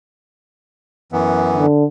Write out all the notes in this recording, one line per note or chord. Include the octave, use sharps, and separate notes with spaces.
F#2 E3 B3
D3